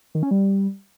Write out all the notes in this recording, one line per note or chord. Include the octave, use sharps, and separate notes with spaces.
D#3
C#4
G3